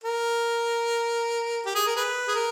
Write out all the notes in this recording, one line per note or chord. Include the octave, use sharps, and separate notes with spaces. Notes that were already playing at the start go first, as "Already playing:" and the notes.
A#4
G4
G#4
A#4
G#4 B4
G#4
A#4